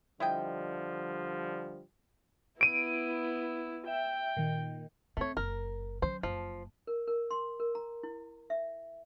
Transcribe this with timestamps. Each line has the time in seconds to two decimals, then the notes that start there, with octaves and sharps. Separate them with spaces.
0.20 D3 F3 G3 E4 D#5 G5
2.61 B3 E4 D7 D#7
3.88 E5 G5
4.37 A#2 D#3
5.17 A3 C4 C#5
5.37 F#1 A#4
6.02 F#3 C#4 C5
6.23 F#1 F3
6.87 A#4
7.08 A#4
7.31 C6
7.60 A#4
7.75 A#5
8.03 E4
8.50 E5